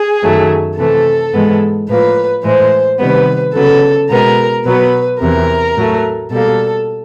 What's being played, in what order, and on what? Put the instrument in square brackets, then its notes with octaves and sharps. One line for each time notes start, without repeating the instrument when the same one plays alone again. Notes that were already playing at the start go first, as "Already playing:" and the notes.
Already playing: [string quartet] G#4
F#2 D#3 F#3 A3
C3 E3 A3 A4
G#2 E3 G#3 B3
A2 F3 A#3 B4
A2 E3 G#3 C5
C3 D#3 G3 B3 B4
C#3 F#3 B3 A4
B2 G#3 B3 A#4
B2 F#3 B3 B4
E2 C3 E3 A#4
A2 F#3 A3
B2 G3 A#3 A4